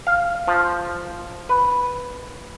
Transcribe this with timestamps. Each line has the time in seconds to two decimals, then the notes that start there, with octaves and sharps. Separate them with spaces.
0.07 F5
0.47 F3
1.49 B4